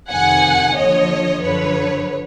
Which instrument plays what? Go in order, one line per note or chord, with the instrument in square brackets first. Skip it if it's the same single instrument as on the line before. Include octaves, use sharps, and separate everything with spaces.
[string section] F2 C3 D#3 F#5 G#5
D#2 D3 F3 C#5 D#5
F#2 D3 F3 B4 C#5